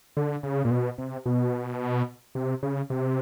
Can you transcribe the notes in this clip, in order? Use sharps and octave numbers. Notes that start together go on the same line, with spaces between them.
D3
C#3
A#2
B2
C3
B2
C3
C#3
C3